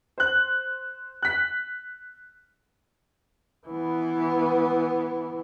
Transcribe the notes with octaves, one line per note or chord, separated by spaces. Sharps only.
C5 F#6
F#6 B6
E3 B3